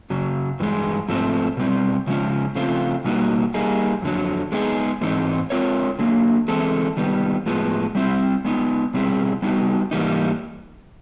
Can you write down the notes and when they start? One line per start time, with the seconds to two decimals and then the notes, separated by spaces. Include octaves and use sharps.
0.10 F#2 C#3 F#3
0.60 G2 E3 G#3
1.08 G#2 F3 A3 C4
1.57 B2 G3 C4
2.07 C#3 F3 G#3 C#4
2.55 C#3 F3 A3 C4 F4
3.04 B2 G3 A#3 D#4 F#4
3.54 G3 A#3 D#4 G#4
4.02 F2 D3 F#3
4.52 G#3 B3 D#4 G#4
5.01 G#2 E3 G#3 C4 D#4
5.50 G#3 C4 F4 A#4 C#5
5.99 D3 F#3 A#3
6.48 E3 G#3 C4 E4 A4
6.97 D#3 G3 B3
7.46 A2 F3 G#3 B3
7.95 G3 C4 E4
8.45 G#3 B3 D#4
8.94 B2 G3 C4 E4 G#4
9.42 G3 B3 D#4 F#4
9.91 G#2 E3 G3 A#3 D#4